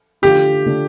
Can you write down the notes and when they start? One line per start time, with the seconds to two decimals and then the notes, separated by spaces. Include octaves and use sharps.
0.22 D3 A3 D4 F4 G4
0.66 D3 A3 D4 F4